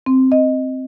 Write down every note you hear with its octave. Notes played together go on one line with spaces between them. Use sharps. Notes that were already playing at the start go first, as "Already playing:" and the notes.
C4
D#5